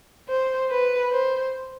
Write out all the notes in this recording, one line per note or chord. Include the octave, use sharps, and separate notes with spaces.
C5
B4
C5